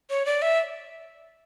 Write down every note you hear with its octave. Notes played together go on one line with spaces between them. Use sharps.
C#5
D5
E5